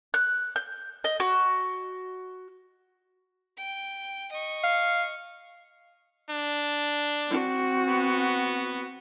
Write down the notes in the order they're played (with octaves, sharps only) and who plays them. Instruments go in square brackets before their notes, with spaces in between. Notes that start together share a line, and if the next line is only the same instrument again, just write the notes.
[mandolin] F#6
G6
D#5
F#4
[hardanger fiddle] G5
D#5 C#6
[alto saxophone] F5
[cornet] D4
[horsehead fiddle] C4 F#4
[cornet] B3